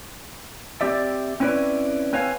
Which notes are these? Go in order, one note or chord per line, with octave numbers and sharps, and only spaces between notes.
C4 G4 D5 E5
C4 C#4 E4 B4 C#5 D5
C4 B4 C#5 F5 G#5